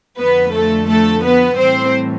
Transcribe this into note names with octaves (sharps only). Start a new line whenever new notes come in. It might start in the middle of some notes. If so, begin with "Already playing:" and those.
F2 D3 F3 B3 B4
A3 A4
A3 A4
B3 B4
A2 E3 G3 C4 C5